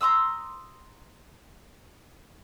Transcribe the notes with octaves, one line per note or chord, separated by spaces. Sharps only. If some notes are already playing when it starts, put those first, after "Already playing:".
A#5 C6 D#6 E6